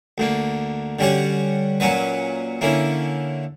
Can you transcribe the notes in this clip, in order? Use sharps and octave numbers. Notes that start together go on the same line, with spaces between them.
D2 D3 A#3
D3 G3 C#4 F#4 C#5
A#2 F#3 C#4 F#4 B4
D3 A#3 C#4 E4